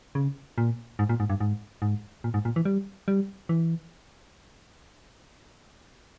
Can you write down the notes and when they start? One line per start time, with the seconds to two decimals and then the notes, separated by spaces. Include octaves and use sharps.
0.15 C#3
0.58 A#2
0.99 G#2
1.09 A#2
1.20 G#2
1.30 G2
1.40 G#2
1.82 G#2
2.24 A#2
2.34 G#2
2.45 A#2
2.56 E3
2.65 G3
3.08 G3
3.49 E3